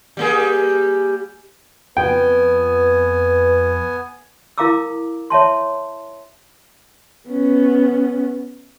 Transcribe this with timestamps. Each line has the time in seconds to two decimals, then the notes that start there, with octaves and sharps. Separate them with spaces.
0.17 G3 A#3 G#4
1.97 F2 B3 B4 G5 G#5
4.58 E4 A#4 F5 A#5 D6 E6
5.30 C#5 E5 A5 C6
7.29 B3 C#4